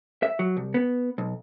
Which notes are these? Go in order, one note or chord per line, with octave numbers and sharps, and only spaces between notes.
E5
F#3
C2
B3
B1